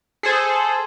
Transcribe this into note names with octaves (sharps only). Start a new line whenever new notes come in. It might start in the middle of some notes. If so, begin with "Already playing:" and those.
G#4 A4 C5